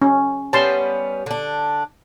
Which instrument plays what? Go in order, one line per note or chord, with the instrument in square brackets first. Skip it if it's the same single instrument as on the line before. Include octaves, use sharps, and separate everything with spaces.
[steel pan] C#4
[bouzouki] G3 B3 C#4 [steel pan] A5 C6
[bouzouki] D3 D4